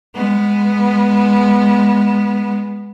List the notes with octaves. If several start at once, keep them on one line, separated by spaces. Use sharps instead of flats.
G#3 B3